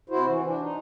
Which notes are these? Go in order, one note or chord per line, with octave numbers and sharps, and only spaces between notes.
C3 E4 F#4 C5
E3
D4
D#4